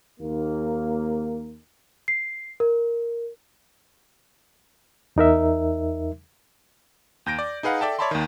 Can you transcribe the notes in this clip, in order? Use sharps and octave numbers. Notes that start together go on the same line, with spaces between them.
D#2 A#3
C7
A#4
E2 D#4 A#4 E5
D#2 G6 A#6 D7
D5
D#4 G#4 B4 F5 F#5
A4 D5 E5 G5 A5
C#5 D5 E5 A5 B5 C6
D#2 D#3